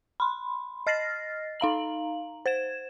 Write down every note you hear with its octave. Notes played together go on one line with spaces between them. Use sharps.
B5 C6
D#5 F6 A6 A#6 C7
D#4 F5 A#5 F#7
C5 G#6 E7